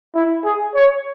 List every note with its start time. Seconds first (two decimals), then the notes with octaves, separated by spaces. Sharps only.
0.14 E4
0.44 G#4
0.75 C#5